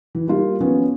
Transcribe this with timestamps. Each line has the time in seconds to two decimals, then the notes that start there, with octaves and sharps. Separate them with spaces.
0.15 E3
0.27 G3 A#3 F4 G4
0.60 D#3 F3 B3 C#4